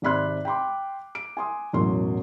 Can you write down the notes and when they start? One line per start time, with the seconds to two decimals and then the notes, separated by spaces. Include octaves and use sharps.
0.02 G#1 C3 D5 B5 C6 F#6
0.45 G5 B5 C6 D6
1.15 D7
1.37 G#5 C6 D#6
1.73 E1 A1 F#3 C6